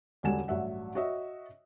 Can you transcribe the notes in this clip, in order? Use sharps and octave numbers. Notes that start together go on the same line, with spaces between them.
E1 C#2 D3 G3 G#5 E7
A1 G2 F#3 E5 F#5
F#4 C#5 D#5 E5